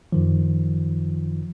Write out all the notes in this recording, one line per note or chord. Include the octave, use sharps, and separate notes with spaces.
F#2 D#3 F3